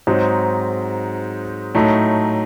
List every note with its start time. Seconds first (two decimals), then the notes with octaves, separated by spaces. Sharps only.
0.07 G#2 F#3 C4 D#4
1.75 A2 F#3 A3 D#4